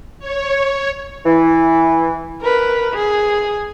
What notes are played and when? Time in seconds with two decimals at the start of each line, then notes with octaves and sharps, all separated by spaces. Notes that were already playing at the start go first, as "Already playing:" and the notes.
0.19 C#5
1.26 E3
2.42 A#4 B4
2.94 G#4